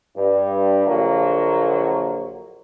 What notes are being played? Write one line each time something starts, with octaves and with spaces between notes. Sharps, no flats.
G2
A#1 D3 F#3 A#3 F4